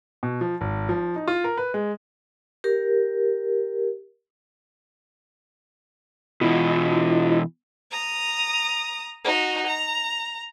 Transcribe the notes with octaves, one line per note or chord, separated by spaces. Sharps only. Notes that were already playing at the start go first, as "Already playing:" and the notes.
B2
F3
G#1
F3
D#4
F4
A#4
B4
G#3
G4 A#4
B2 E3 E4 F4 D#5
A#5 D#6
D#4 F#4
A#5